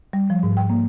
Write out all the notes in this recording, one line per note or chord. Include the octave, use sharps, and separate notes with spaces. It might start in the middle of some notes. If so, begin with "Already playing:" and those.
G3
F3
G#2
G5
A#3